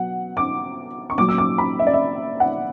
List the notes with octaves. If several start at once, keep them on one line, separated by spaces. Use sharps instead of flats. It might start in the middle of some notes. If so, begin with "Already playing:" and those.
Already playing: B2 F#3 F#5
D6
C#6
A#2 F#3 D6
E6
D6
B5
E5
D5
E5
F#5